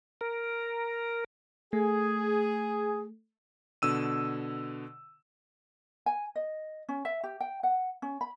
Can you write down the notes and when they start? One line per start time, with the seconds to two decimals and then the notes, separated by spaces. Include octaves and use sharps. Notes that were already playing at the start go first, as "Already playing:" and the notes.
0.21 A#4
1.73 A3 G#4
3.82 B2 D3 E6 D#7
6.06 G#5
6.36 D#5
6.89 C#4
7.05 E5
7.24 G4
7.41 G5
7.63 F#5
8.02 C#4
8.21 B5